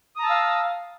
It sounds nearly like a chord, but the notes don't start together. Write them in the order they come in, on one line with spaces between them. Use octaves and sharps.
D#6 A#5 A5 E6 F5